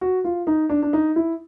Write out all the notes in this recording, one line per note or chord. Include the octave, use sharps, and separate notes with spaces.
F#4
F4
D#4
D4
D4
D#4
E4